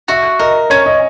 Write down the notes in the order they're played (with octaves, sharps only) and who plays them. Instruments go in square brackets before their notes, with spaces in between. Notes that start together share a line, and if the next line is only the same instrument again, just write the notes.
[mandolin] F#4 [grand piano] E5
[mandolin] A#4 [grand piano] D#5
[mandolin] C#4 [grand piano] C#5
[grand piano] D#5